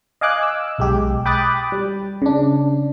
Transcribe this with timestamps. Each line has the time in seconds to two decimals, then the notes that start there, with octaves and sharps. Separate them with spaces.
0.21 D#5 F5 G#5 D6 F#6
0.43 E6
0.78 B1 G#3 G4
1.26 G5 B5 D6 D#6 F#6 A6
1.72 G3
2.22 C#3 D4